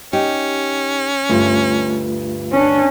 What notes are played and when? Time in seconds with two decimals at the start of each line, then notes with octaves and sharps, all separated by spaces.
0.13 C#4 D#4 G4
1.29 D2 G2 A3 F4
2.52 C#4 D4